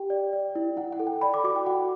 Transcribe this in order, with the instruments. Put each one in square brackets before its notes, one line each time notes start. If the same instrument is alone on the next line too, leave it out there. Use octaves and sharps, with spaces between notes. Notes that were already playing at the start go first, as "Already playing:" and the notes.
Already playing: [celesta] G4 G5
D5
D5
E4
E4 F#5
F#5
A4
G5
D5 B5
D6
F#4 D6
G5
F#4 F#5